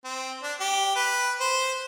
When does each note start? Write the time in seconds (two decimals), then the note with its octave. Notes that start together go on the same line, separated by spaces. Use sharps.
0.04 C4
0.43 D4
0.60 G4
0.96 B4
1.40 C5